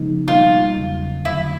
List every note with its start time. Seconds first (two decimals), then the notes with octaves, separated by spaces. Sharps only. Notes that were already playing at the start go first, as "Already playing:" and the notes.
Already playing: C#3 F3 G#3 B3 D#4
0.28 B2 G3 A#3 D#4 F4
0.77 E2 C#3 F#3
1.25 F2 D3 F#3 A3 E4